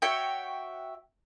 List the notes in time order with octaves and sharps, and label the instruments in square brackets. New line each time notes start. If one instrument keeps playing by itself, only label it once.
[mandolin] F#4 C#5 E5 G5